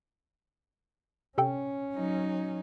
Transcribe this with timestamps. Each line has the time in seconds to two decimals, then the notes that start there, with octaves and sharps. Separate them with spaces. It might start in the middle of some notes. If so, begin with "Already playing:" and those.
1.38 C3 C#4 A4 G5
1.95 F#3 D#4